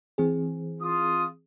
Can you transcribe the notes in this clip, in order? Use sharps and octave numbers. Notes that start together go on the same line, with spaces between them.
E3 C4 G#4
F4 D#6